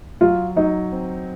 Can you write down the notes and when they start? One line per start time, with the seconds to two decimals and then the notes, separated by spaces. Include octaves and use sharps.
0.21 F#3 F4
0.56 F#3 D#4
0.92 C4